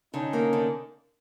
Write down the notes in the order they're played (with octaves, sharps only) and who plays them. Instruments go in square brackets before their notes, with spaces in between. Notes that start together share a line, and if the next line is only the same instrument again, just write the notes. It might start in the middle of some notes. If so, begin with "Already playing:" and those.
[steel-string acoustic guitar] D3 [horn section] C#4 D#4
[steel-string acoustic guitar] A#3
D3